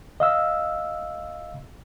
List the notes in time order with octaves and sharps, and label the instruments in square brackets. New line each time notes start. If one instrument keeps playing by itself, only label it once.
[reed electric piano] D#5 F5 E6